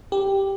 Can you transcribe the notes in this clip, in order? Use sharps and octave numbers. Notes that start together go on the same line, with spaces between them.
G4